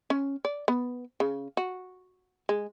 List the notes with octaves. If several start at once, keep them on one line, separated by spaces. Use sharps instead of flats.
C#4
D5
B3
C#3
F#4
G#3